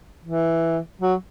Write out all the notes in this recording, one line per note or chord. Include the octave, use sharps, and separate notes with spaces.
E3
F#3